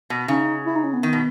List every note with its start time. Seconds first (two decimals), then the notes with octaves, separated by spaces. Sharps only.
0.10 B2
0.28 C#3 D#4
0.66 E4
0.75 D#4
0.84 C#4
0.93 B3
1.03 D#3
1.13 B2